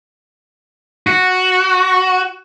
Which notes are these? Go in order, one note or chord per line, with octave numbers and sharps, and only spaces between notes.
F#4